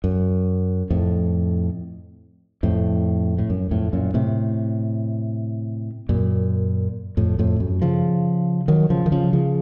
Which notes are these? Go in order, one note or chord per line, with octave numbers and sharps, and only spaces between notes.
F#2
F2 A2
F2 A2
A2
F#2
F2 A2
F#2 A#2
A2 C3
F#2 A#2
F2 A2
F2 A2
F#2
C#3 F3
D#3 F#3
C#3 F3
D#3
C#3 F3
C#3 F3